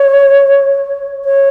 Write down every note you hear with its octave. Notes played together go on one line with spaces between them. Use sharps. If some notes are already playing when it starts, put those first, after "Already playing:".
Already playing: C#5
C#5